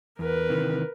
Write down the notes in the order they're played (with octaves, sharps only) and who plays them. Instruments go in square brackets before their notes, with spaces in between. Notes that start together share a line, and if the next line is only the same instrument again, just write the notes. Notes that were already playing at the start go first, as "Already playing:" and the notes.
[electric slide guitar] E2 [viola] A#4 B4
[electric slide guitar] C3 D#3 E3